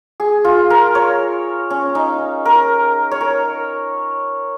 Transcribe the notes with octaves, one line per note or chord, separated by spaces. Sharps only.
G#4
F4
A#4
C#5
C#4
D#4
A#4
C#5
A#4